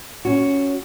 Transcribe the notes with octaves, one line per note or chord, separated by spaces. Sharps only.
C#4 F#4